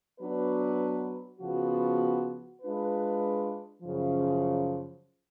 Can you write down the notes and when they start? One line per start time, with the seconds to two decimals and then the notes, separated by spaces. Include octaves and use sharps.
0.19 F#3 B3 D4 F#4 B4
1.40 C#3 F3 B3 F#4
2.61 G#3 D4 F4 B4
3.82 F#2 C#3 F3